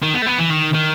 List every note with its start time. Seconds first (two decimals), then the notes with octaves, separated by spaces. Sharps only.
0.03 D#3
0.14 B3
0.22 A3
0.27 B3
0.39 E3
0.51 D#3
0.74 D#3